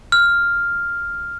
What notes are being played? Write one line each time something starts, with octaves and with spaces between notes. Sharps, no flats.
F6